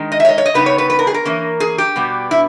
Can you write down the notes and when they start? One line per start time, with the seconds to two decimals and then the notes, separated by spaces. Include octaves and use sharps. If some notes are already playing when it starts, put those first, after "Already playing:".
Already playing: D#3 G#3 D#4
0.12 D#5
0.20 E5
0.25 C#5
0.29 D#5
0.38 C#5
0.46 D#5
0.54 C#3 G3 B3 D#4 B4
0.66 C#5
0.78 B4
0.90 B4
0.99 A#4
1.07 G#4
1.14 A#4
1.25 E3 A#3 C#4
1.60 G#4
1.78 G4
1.96 B2 G3 B3
2.31 E4